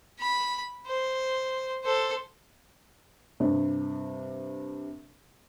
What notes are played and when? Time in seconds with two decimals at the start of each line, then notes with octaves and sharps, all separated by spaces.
0.20 B5
0.87 C5
1.84 A4 C5
3.40 G2 C3